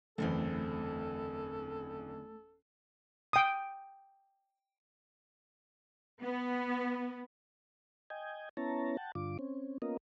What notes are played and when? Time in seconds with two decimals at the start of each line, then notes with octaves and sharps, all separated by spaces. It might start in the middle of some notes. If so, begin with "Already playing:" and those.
0.18 F#1 E2 D3 E3 A3 C4 A4
3.33 G5 D#6
6.21 B3
8.10 D#5 G5 G#5
8.57 B3 C#4 E4 C#5 A5 A#5
8.97 F#5 G5 A5
9.15 G2 D3 F4 D6
9.39 C4 C#4
9.82 A#3 B3 C#4 F4 A#4 D#5